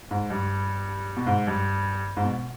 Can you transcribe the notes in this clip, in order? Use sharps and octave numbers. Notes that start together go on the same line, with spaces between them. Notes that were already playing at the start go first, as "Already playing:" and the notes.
G#2
G2
B2
G#2
G2
G#2
B2